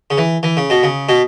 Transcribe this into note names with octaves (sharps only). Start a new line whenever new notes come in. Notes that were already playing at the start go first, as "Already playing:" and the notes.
C#3
E3
E3
C#3
B2
C#3
B2